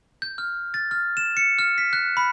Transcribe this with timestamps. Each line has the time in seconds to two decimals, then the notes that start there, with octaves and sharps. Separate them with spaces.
0.22 G6
0.38 F6
0.74 A6
0.91 F6
1.17 E7
1.37 C#7
1.59 F6
1.78 B6
1.93 F#6
2.17 B5